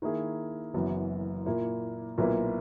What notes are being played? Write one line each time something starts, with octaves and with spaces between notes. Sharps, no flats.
D#3 A#3 E4 G#4
F#1 F#2 E3 B3
A#2 A#3 E4
B1 A#2 A#3 E4 B4